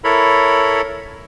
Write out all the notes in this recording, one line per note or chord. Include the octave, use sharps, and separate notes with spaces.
E4 A4 A#4 C#5 B5